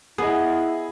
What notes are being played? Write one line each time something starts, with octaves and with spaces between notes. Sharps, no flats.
B3 E4 G#4 D#5